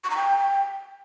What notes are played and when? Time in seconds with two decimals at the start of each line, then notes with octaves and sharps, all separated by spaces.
0.04 C#6
0.10 A#5
0.17 G5